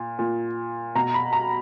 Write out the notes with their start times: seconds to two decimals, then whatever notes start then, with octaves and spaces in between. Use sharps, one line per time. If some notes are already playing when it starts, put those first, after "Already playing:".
Already playing: A#2
0.19 A#2
0.95 B2 A#5
1.14 B5
1.33 A#5